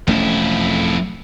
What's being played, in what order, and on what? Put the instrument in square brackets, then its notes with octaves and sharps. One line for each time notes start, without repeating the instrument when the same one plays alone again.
[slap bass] E1 A3 C#4 [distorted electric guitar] F2 E4